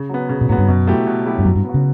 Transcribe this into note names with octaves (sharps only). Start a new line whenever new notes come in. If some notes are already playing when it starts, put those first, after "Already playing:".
Already playing: C#3
F#3 B3
C#3
B2
A2 F#3 B3
G2
F#2 B2
F#3 A3 E4 G4
B2
F#3 A3 E4 G4
G2
F#2 F#3
G2
B3 F#4
C#3